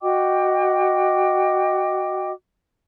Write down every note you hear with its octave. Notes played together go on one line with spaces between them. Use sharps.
F#4 D#5 G5 D6